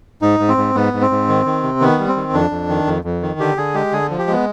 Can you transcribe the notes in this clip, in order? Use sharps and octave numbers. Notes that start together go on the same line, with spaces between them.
G#2 D#4
G#2
C4
G#2
G#2 B3
G#2
C4
G#2
D#3
D#3
C3
D#3 B3
G3
C4
D#3
F2 D4
F2
D#3
F2
F2
D#3
D3 G4
D3 G#4
G#3 G4
D3 G#4
F3
G4
G#3 B3